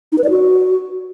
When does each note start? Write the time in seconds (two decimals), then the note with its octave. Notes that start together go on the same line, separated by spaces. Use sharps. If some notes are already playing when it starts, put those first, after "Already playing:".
0.12 D#4
0.18 B4
0.24 D5
0.30 F#4